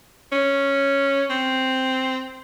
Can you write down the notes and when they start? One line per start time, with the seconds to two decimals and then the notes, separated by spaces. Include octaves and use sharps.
0.33 C#4
1.30 C4